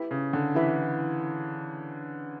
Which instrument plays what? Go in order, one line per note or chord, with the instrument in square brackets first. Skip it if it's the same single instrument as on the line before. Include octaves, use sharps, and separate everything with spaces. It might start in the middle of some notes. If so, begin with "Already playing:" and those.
Already playing: [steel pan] E4 G4 B4 E5 B5
[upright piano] C#3
D3
[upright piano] E3 [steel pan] E4 G4 B4 E5 B5